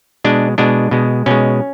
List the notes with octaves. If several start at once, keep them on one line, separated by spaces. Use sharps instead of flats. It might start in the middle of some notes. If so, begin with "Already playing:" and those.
B2 G#3 D4
B2 G#3 D4
B2 G#3
B2 G#3 C#4